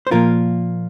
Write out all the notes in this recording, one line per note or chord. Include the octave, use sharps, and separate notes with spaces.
C5
A#2 F3 A#3 F4 A#4